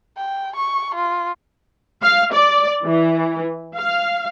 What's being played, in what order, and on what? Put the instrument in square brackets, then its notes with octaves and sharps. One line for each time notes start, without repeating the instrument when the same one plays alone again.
[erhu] G5
C#6
F4
[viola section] F5
D5
E3
F5